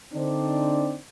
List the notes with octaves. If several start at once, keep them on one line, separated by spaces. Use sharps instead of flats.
D3 C4 D4 D#4 C5 D5